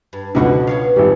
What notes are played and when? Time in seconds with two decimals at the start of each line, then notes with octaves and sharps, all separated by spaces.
0.13 G2
0.35 C#2 B2 D3 F3 F#4 B4
0.67 B3 C#5 F5
0.96 G#1 G3